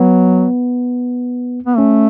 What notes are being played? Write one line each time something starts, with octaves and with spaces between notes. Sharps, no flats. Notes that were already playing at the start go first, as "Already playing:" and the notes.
Already playing: F#3 B3
B3
A3 C#4